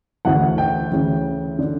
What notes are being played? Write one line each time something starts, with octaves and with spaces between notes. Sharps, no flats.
D2 C#3 E3 F#5
G5
D2 C#3 E3
D3